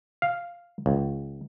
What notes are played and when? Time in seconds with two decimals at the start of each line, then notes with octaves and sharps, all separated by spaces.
0.22 F5
0.86 C#2